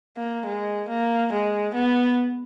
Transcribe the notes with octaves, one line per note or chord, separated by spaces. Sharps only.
A#3
G#3
A#3
G#3
B3